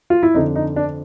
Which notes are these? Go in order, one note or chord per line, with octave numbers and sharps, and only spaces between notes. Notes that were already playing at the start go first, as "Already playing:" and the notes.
F4
E4
F2 D3 D#4
D#4
D4